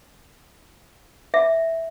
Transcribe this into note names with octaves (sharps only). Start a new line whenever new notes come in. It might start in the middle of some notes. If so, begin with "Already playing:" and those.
E5